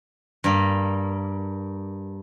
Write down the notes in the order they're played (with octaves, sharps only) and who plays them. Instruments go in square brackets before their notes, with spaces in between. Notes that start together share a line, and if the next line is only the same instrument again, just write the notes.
[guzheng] G2 A#3